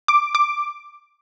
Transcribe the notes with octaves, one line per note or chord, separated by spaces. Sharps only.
D6
D6